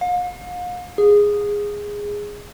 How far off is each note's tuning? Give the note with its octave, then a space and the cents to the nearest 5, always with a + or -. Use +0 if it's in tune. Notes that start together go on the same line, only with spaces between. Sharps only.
F5 +40
G#4 -10